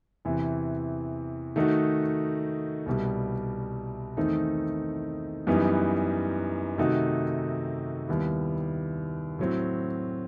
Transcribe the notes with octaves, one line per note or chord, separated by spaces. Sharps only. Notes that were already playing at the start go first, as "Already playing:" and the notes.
E2 C3 E3
D#3 A3 D#4 F#4
C2 B2 G3
E2 D#3 A3 C4 D#4
F#2 E3 G3 B3 D#4
C3 D#3 A3 D#4 F#4
D#2 D#3 G3 B3 E4
A2 F#3 C4